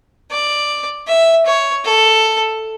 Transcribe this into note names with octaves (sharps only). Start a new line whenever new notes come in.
D5
E5
C#5
A4